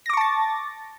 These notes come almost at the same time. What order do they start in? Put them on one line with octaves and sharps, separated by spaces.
A#6 D6 C#6 A5 A6